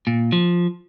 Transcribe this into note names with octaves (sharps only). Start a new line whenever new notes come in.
A#2
F3